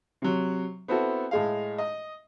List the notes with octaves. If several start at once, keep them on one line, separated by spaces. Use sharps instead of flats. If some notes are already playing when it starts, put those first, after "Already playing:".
C3 F#3
B3 C4 E4 F#4 A4
A2 G#3 F5
D#5